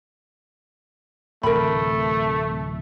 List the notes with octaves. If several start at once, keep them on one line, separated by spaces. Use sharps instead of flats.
D1 C3 E3 A3 A#4 B5